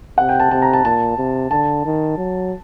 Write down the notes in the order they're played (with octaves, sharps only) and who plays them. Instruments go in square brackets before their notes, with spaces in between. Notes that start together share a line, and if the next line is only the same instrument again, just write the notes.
[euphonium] C3 [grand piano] F#5
[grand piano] G5
A5
[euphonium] C3 [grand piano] A5
[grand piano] A#5
A5
[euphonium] A#2 [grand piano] A5
[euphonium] C3
[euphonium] D3 [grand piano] A5
[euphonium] D#3
F#3